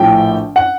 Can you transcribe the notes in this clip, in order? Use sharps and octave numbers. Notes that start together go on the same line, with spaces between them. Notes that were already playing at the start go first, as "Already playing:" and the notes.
Already playing: A#1 A2 F3 G5
F#5